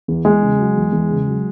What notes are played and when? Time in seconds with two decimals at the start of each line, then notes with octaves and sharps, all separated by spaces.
0.08 E2
0.25 E2 G#3
0.42 C#3
0.59 F#3
0.77 E2
0.92 E2
1.10 C#3
1.27 F#3